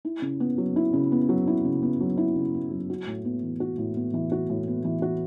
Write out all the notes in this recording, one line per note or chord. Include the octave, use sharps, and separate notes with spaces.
E4
C#3
B3
F#3
E4
C#3
B3
F#3
E4
C#3
B3
F#3
E4
C#3
B3
F#3
F#4
A2
B3
E3
F#4
A2
B3
E3
F#4
A2
B3
E3
F#4